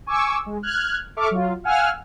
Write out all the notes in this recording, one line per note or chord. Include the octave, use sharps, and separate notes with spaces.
G#5 C#6 D6 E6
G#3
F6 F#6 G#6
A4 E5 C#6 D6 F6
F#3 F4
F5 F#5 G#5 E6 F6